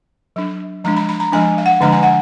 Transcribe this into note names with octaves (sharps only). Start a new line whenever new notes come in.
F#3 D4
F3 G#3 D4 A#5
B5
B5
A#5
F3 G#3 D4 G#5
F5
F#5
D3 F3 G#3 D4 A#5
G#5
F#5